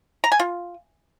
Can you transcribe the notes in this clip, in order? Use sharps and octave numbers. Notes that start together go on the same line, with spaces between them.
A#5
G#5
F4